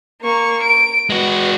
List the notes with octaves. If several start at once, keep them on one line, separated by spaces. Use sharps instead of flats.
A#3 C#6
D7
G#3 F#4 B4